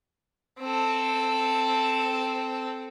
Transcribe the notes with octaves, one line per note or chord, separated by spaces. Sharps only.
C4 A4